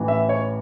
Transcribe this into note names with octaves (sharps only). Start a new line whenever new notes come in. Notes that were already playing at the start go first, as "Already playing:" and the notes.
Already playing: A1 A2 E3
E5
C#5